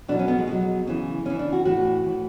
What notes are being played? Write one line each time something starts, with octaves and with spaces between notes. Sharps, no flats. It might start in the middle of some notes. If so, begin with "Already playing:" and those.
B2 F#3 D4
C#4
B3
G#3
B2 F#3
C#3 E3
C#3 E3 C#4
D4
F#4
A2 E3 F#4
A2 E3